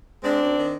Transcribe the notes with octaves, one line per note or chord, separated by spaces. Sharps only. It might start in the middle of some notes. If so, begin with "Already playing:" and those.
G#3 C4 D4
F#2
D#3